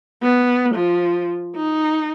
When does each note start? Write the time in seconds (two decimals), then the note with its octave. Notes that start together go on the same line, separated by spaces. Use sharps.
0.23 B3
0.75 F3
1.56 D#4